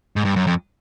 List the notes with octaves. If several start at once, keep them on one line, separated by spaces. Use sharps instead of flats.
G#2
G2
F#2
F2